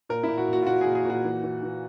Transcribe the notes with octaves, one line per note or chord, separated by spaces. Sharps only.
A#2 A#4
A#2 E4
F#4
A#2 F#4
F4
A#2 F#4
A#2 G#4
G#4
A#2 F#4
E3
E3
E3